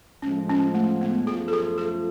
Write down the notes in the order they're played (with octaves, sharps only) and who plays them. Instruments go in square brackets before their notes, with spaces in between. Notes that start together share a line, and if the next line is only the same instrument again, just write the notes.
[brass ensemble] A2 F3 G#3 [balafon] C#4
[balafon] C#4
A3
B3
[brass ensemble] F#2 F3 A3 F4 [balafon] G#4
[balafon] A4
G#4
A4